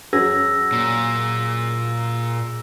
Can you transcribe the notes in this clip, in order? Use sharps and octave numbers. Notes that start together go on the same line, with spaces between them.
F#2 F#3 G#4 E6 A#6
A#2